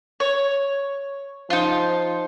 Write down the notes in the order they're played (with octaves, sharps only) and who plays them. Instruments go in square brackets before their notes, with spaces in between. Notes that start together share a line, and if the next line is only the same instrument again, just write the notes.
[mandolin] C#5
[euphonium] F3 [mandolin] D#4 F4